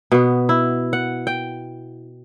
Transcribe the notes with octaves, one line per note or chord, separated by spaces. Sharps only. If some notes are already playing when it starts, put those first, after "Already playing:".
B2 B3
E4
F#5
G5